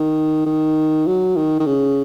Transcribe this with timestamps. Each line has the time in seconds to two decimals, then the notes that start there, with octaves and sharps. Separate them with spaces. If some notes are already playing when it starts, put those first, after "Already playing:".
Already playing: D#3
0.46 D#3
1.07 F#3
1.36 D#3
1.60 D#3
1.66 C#3